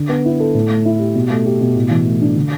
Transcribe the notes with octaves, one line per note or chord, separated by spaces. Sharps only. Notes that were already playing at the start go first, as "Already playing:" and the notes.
Already playing: D3
B3
E4
A4
A2
A3
E4
G4
B2
A3
G4
B2
A2
E3
A3
D4
D3